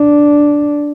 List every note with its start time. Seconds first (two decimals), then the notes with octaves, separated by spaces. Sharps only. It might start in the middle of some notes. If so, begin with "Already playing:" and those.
Already playing: D4